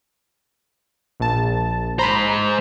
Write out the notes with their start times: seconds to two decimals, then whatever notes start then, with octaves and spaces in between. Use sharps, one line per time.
1.20 A#1 A5
1.99 G#2 C5 A#5 B5